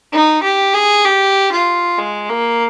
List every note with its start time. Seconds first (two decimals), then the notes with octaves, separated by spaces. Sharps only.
0.13 D#4
0.43 G4
0.74 G#4
1.05 G4
1.52 F4
1.98 G#3
2.29 A#3